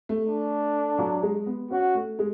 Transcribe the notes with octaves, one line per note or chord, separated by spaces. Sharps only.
A3
D4
F#3
G#3
B3
C#4 F#4
A3
G#3